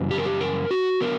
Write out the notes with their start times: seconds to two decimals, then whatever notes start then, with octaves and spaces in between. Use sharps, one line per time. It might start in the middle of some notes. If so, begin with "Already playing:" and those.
Already playing: F#2 C#3 E3 G3
0.11 G4
0.18 A#4
0.25 G4
0.41 A#4
0.71 F#4
1.00 D3 F#3 B3 A#4